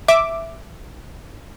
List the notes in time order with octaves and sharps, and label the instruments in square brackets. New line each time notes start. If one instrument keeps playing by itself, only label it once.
[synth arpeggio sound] E5 D6